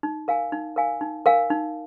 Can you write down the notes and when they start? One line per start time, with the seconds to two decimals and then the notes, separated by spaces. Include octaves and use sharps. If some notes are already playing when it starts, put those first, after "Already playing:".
0.03 D#4
0.28 A#4 F5 G#5
0.52 D#4
0.76 A#4 F5 G#5
1.01 D#4
1.26 A#4 F5 G#5
1.50 D#4